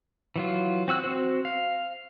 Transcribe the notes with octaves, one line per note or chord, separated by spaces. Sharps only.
E3 F#3 F4
C4 F#4 E6 F#6
C4 F#4 C5
F5